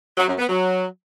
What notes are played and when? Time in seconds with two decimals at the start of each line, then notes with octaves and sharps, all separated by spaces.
0.16 F#3
0.27 F#2
0.38 B3
0.49 F#3